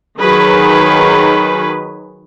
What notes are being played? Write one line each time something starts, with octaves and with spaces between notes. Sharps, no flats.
D#3 F#3 G#4 B4